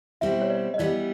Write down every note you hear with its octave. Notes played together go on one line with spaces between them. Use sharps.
B2 G3 C4 E4 E5
C#5
D5
D#5
E3 G3 B3 D5